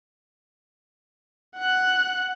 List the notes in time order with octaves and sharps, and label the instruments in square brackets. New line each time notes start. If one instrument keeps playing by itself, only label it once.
[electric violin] F#5 F#6